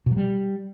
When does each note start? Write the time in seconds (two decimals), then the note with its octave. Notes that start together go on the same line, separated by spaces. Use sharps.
0.06 B2
0.11 F#3
0.17 G3